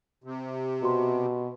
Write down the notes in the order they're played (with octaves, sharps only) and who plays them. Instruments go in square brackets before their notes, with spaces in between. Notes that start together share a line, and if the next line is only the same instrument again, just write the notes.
[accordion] C3
[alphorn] B2 [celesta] F#4 C6